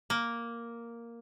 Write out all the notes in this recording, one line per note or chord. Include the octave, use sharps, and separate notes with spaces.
A#3